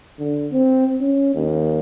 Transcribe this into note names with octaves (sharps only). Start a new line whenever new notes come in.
D3
C4
C#4
D#2